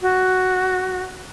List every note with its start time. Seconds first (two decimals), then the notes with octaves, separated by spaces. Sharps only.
0.01 F#4